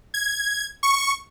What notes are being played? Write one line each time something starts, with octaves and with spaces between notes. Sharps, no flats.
G#6
C#6